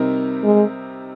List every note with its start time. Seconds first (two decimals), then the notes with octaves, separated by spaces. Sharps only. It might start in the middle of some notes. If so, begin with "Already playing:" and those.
Already playing: C3 G3 C4 D#4 A#4
0.44 G#3